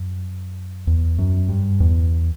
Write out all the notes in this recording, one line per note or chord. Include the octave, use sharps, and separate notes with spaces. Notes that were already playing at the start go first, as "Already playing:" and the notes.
Already playing: F#2
E2
F#2
G2
E2